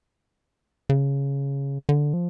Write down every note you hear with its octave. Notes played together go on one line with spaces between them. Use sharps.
C#3
D3
F3